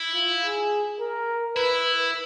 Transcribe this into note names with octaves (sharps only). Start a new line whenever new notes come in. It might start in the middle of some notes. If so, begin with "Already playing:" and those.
Already playing: E4
F4
G#4
A#4
E4 B4